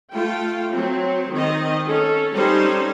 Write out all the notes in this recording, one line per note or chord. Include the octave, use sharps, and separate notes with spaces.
A3 F4 G5
F#3 C4
D#3 C4 D#5
C#4 A4
G3 C4 C#4 D#4 A4 C5